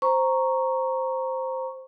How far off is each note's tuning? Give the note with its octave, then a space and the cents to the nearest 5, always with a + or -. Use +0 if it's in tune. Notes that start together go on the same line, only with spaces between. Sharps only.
C5 +0 A#5 +0 C#6 +0